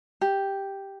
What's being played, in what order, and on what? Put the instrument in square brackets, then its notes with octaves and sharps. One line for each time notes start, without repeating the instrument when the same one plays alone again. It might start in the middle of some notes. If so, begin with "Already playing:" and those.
[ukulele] G4